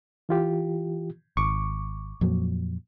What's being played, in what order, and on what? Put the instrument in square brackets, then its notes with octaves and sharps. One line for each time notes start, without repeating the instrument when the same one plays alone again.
[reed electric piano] E3 F4 G4
[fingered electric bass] G#1 [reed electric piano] C#6 D6
[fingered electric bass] F2 A#2 F#3